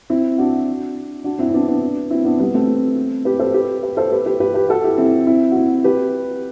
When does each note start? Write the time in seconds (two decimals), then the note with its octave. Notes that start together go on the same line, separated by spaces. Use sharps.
0.10 C4 E4
0.38 D4 F#4
1.24 D4 F#4
1.39 C4 E4
1.49 C4
1.54 B3 D4
1.68 B3 D4
2.10 C4 E4
2.25 B3 D4
2.40 G3 B3
2.54 A3 C4
3.25 G4 B4
3.40 A4 C5
3.54 G4 B4
3.83 G4 B4
3.97 A4 C5
4.12 G4 B4
4.26 G4 B4
4.40 G4 B4
4.54 G4 B4
4.69 F#4 A4
4.83 E4 G4
4.98 C4 E4
5.27 C4 E4
5.52 F#4
5.56 C4 E4
5.84 G4 B4